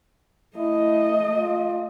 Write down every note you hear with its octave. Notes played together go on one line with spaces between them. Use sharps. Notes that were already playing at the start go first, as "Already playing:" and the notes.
A3 E4 D#5
F4